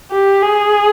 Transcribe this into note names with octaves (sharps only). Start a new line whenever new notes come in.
G4
G#4